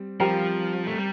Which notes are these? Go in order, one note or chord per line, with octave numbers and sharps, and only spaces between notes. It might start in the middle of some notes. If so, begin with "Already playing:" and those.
Already playing: G3 C4
F3 G3 C4 G4 A#4
A3
G3